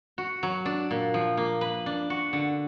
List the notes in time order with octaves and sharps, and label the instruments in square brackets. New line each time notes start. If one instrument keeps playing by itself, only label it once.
[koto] F#4
F#3
D4
A#2
F3
A#3
B4
D4
F#4
D3